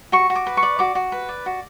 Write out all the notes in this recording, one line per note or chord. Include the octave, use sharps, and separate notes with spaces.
F#4 C#6
F#4
D6
B4
C#6
D5
F#4 D6
F#4
B4
D5
F#4